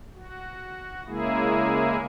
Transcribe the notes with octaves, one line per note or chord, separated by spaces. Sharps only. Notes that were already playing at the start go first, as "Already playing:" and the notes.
F#4
C#3 G#3 A#3 E4 G#4